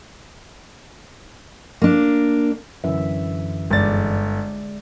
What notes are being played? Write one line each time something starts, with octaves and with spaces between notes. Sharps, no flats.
A#3 D4
F#2 D3 E3 E5
G1 G#3 D5 A6